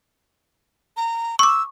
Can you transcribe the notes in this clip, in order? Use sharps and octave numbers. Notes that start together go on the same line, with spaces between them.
A#5
C#6 D6 E6